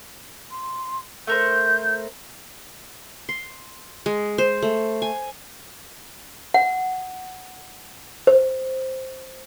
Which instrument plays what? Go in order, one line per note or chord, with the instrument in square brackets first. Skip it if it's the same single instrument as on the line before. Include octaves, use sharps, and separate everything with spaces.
[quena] C6
[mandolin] A3 A#4 C5 [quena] G6
[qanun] C6
G#3
C5
A3
G#5
[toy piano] F#5
C5